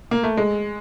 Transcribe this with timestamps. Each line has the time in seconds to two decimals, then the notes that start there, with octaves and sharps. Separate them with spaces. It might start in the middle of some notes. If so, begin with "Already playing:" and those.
0.11 A#3
0.23 A3
0.37 G#3